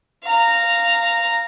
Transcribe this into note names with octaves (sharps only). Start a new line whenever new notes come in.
F5 A#5